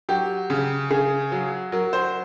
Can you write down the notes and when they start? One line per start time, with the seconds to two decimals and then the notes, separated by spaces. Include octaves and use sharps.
0.09 F#3 G4
0.50 C#3
0.91 C#3 G#4
1.32 F#3
1.72 F#3 A#4
1.93 C5